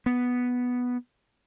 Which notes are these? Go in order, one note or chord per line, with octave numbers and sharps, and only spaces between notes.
B3